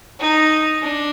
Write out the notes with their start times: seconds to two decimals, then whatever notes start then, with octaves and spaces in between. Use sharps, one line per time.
0.19 D#4
0.82 D4